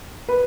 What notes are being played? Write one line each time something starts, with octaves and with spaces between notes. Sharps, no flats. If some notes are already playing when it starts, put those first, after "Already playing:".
B4